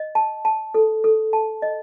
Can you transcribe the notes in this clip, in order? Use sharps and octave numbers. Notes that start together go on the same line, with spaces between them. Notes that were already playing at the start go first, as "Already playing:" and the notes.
Already playing: D#5
A5
A5
A4
A4
A5
D#5